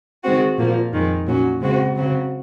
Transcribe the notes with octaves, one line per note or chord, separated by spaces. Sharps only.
D#3 G#3 C4 F#4
A#2 F3 A#3
F2 D#3 G#3
A#2 F#3 C#4 F#4
C#3 G#3 C4 F#4
C#3 F#3 C4 F#4